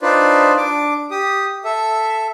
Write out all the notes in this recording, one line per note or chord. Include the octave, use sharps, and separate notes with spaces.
D4 D#4 F4 B4 C5 D5
D4 D6
G4 D#6
A4 E5